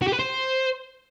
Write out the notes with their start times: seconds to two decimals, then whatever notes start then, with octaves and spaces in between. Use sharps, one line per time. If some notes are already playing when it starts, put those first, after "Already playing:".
0.02 F#4
0.08 G4
0.14 B4
0.19 C5